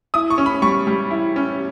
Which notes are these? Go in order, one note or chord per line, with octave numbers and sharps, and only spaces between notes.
E4 D#6
C#6
C#4
B5
G3 C#6
G3
E4
C#4